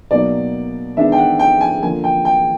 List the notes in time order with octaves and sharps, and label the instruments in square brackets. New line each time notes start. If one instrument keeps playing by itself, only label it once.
[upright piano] B2 F#3 A#3 D#4 D5
D#3 G#3 B3 D4 E5
G5
F#5
G5
G#5
D3 F3 A#3 G#5
G5
G5